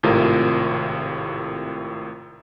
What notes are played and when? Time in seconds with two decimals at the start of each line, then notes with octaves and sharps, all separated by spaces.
0.03 G#1 A2 C3 F4 A#4